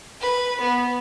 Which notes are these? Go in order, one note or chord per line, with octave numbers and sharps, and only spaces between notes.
B4
B3